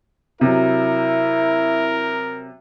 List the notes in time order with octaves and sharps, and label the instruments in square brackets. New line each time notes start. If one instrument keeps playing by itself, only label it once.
[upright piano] C3 F#3 [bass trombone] E4 [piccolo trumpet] A#4